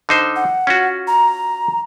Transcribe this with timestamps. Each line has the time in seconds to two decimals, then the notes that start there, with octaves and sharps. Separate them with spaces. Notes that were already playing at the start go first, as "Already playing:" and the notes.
0.09 D3 D#4 C5
0.36 F#5
0.67 C#4 F4 F#4
1.07 A#5